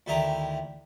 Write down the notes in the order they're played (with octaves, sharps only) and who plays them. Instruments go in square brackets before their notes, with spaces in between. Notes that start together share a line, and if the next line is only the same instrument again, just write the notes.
[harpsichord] D2 D#3 E4 G4 D#5 A#5